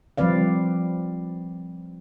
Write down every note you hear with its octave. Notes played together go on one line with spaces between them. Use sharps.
F3 G3 C4 B4 D5 F5